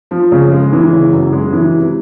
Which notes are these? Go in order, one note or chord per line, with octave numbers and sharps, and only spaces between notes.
F3
C#3
G#3
E3
C#3
F#2
G#3
E3
C3